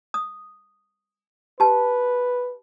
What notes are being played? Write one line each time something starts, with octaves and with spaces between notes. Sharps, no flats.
D#6
G4 B4 A5